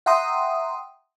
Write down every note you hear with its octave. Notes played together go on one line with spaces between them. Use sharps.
E5 F#5 G5 A#5 C6 D#6